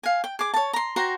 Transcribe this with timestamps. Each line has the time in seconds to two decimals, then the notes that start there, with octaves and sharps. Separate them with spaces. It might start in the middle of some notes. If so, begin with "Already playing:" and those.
0.03 F5 G#5
0.24 G5
0.39 G#4 D6
0.54 C#5 A5
0.73 A#5 C6
0.96 F#4 C5 G5 A#5